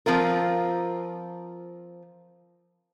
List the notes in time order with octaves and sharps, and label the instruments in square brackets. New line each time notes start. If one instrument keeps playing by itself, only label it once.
[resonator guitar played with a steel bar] F3 C4 F4 A#4